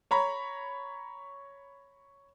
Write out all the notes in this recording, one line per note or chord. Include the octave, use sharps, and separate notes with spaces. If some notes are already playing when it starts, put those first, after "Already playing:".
C#5 A#5 B5